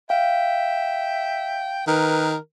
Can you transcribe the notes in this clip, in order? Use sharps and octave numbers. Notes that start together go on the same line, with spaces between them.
E5 F5 G5
D#3 A#4 B4